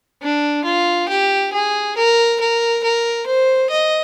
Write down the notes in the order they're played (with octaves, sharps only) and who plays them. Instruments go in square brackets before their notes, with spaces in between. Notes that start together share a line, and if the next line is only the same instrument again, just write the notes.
[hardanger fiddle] D4
F4
G4
G#4
A#4
A#4
A#4
C5
D#5